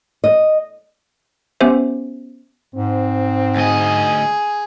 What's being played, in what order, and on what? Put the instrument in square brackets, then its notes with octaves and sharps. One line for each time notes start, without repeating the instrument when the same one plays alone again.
[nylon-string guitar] D#5
[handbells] B3 C#4 G4 C5 E5
[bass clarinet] G#2 [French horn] C4
[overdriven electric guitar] D2 D#5 [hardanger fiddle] G#4